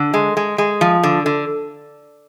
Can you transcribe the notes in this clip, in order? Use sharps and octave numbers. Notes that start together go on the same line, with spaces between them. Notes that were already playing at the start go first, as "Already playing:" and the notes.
Already playing: D3
G#3
G#3
G#3
F3
D3
D3